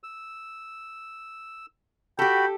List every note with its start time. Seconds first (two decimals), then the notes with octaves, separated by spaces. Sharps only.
0.03 E6
2.19 F#4 G4 A4 G5 B5